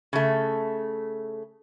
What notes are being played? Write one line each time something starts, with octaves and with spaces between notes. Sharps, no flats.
C#3 A3